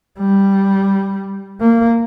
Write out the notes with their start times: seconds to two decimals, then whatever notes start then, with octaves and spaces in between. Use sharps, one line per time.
0.20 G3
1.61 A#3